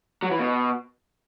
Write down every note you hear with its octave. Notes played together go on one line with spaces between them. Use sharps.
F#3
E3
B2